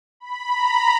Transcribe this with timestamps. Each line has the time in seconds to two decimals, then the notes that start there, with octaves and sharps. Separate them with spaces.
0.20 B5
0.50 A#5